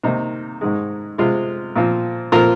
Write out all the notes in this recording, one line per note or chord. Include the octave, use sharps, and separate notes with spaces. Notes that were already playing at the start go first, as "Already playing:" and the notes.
C3 D#3 A#3 D#4
G#2 D#3 G#3
C3 G#3 C4 F4
A#2 F3 C4
A#2 F3 C4 F4 A#4